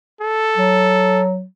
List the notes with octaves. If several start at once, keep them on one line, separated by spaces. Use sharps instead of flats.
A4
F#3